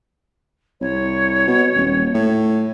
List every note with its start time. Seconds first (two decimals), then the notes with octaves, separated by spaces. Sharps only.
0.81 C2 C#5
1.47 B2
1.76 D#1
2.14 A2